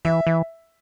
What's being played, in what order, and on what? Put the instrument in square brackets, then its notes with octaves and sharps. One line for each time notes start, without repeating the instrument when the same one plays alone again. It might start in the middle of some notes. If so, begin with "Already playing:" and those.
[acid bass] E3 [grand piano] E5
[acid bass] E3